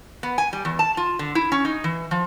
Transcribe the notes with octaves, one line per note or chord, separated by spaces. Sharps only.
B3
G#5
G3
E2
A5
F4
D3
E4
C#4
D#4
E3
F3